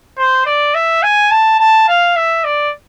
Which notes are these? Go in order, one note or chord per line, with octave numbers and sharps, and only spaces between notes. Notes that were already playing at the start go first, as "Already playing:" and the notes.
C5
D5
E5
G#5
A5
A5
F5
E5
D5